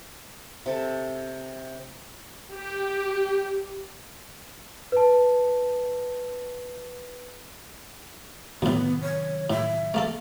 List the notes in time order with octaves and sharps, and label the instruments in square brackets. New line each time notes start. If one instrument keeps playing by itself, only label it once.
[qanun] C3 A4 A5
[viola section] G4
[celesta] B4 A5
[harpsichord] D2 A2 [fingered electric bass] C3 D#3 F#3 [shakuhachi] B3
[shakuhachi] C#5
[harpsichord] A2 [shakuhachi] E5
[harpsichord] A3 A#3 A4